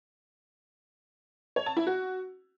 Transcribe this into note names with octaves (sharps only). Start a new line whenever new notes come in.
C#5
A5
E4
F#4